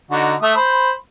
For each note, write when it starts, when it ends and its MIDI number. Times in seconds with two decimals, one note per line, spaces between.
0.11 0.34 50
0.11 0.34 63
0.11 0.34 66
0.42 0.53 57
0.42 0.53 76
0.42 0.53 87
0.56 0.91 72
0.56 0.91 83